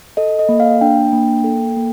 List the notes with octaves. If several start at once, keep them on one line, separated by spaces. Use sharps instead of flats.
A4 D#5
D#5
A#3
F5
D4 G5
A#3
A4
A#3